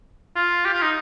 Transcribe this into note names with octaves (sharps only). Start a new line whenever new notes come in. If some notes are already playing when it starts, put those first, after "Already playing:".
F4
G4
F4
D#4